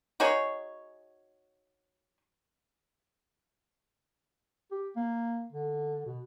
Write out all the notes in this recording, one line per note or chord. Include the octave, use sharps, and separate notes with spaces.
D#4 F#4 G#4 C#5
G4
A#3
D3
B2